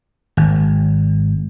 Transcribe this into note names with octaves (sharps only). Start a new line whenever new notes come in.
G#1